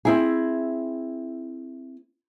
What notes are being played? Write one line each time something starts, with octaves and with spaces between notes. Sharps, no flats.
C4 E4 G#4